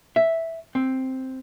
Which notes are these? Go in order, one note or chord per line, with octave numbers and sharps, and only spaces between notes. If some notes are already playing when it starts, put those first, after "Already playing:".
E5
C4